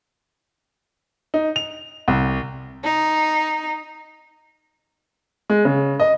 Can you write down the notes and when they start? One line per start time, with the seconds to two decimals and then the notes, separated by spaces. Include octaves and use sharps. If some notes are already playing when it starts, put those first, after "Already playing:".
1.34 D#4
1.56 F7
2.08 C2
2.83 D#4
5.50 G#3
5.65 C#3
6.00 D#5